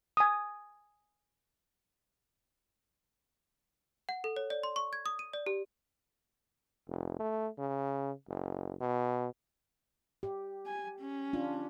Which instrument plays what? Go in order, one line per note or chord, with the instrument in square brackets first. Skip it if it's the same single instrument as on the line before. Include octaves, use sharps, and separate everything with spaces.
[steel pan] G#5 D#6
[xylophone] F#5
A4
C#5
D5
C6
C#6
G#6
D#6
D#7
D5
G4
[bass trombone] F1
A3
C#3
F#1
B2
[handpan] G4
[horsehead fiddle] G#5
C#4
[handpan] D4 F4